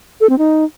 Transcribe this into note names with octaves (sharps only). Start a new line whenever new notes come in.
A4
C4
D#4